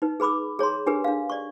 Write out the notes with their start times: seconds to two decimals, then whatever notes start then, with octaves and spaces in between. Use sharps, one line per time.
0.02 D#4 B4
0.20 G#4 B4 B5 D6 E6
0.59 G#4 C#5 A#5 C6
0.86 D4 G4 G#4 A#4 B4
1.04 D4 F5
1.30 D5 C#6